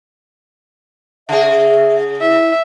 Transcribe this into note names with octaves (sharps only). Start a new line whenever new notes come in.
C#3 G#4 E5
E4 E5